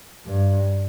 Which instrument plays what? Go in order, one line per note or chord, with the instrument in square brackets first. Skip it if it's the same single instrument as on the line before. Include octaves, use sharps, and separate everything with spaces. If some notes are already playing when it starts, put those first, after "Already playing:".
[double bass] G2